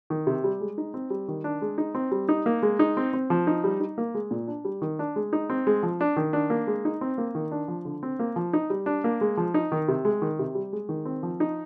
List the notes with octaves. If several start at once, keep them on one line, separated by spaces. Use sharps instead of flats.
D#3
C3
G3
G#3
D#4
C4
G3
D#3
D4
G#3
D#4
C4
G3
D#4
A#3
G#3
D#4
C4
C4
F3
D#4
G3
D#4
A#3
G#3
A#2
D4
G3
D#3
D4
G#3
D#4
C4
G#3
F3
D4
D#3
D4
A#3
G#3
D#4
C4
A#3
D#3
D4
F3
D3
C4
A#3
F3
D#4
G3
D4
A#3
G#3
F3
D#4
D#3
C3
G#3
D#3
C3
G3
G#3
D#3
C4
F3
D#4